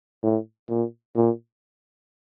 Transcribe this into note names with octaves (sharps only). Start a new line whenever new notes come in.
A2
A#2
A#2